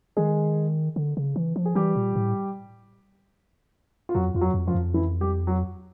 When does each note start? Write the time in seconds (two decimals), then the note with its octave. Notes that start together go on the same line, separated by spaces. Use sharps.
0.17 D#3 G#3 G#4
0.96 D3
1.17 C#3
1.36 E3
1.56 F3
1.66 G#4
1.75 E3 G3 G4
1.96 A#2
2.16 A2
4.09 F4
4.15 F2 F#3 F#4
4.35 F2 F4
4.41 F#3 F#4
4.54 F2
4.67 F3 F4
4.74 F2
4.94 E3 E4
5.20 G3 G4
5.47 F#3 F#4